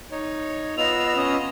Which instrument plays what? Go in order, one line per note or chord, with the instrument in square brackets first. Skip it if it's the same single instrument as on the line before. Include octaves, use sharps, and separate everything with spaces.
[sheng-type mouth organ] D#4 C#5
[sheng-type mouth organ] B3 F4 E6 [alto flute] D#5 [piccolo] F7
[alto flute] C#4 [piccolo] D#5